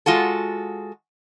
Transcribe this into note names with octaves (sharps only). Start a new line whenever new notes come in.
G#3 F4 F#4 A4